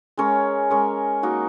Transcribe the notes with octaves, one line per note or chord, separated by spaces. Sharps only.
G#3 C#4 A#4 C#5
G#3 C#4 A#4 C#5
A#3 D#4 F#4